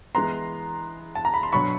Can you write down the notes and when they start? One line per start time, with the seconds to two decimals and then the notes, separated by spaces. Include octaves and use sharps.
0.15 E3 G#3 B3 A#5 C6
1.15 A5
1.25 A#5
1.34 B5
1.43 C6
1.52 B2 F#3 B3 D4 B5 C#6